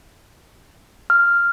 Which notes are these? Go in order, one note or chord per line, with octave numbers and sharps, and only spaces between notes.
F6